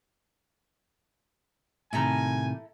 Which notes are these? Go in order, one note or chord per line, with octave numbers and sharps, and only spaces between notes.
A2 C3 D#3 E4 A4 G#5 A#5